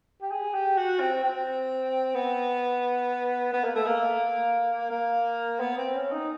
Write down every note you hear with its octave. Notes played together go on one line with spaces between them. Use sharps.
G4
G#4
G4
F#4
C4
C4
B3
B3
A#3
A3
A#3
A#3
B3
C4
C#4
D#4